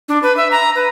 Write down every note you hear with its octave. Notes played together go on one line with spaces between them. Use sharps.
D4
B4
E5
A#5
B4